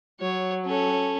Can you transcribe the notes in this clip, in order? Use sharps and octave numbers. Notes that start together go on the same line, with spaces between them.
F#3 C#5
C#4 A4